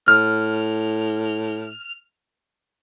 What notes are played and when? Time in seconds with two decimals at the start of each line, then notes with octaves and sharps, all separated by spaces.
0.08 A2 F6